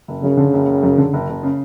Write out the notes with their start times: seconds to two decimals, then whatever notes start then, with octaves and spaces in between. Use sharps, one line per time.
0.08 F#1
0.23 F#2 C#3
0.37 D3
0.53 F#1
0.68 F#1
0.83 F#2
0.98 D3
1.13 F#1
1.29 F#1
1.43 C#3